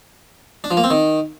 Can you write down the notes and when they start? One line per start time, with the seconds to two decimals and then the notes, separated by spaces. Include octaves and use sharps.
0.64 D4
0.71 F3
0.77 A#3
0.84 C4
0.90 D#3